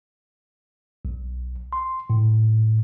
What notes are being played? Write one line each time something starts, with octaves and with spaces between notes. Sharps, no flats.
B1
C6
A2